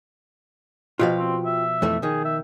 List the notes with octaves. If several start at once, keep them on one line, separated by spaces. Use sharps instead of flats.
B2 F3 F4 G4 F5
C4
E5
F2 E3 A3
D#3 G#4
E5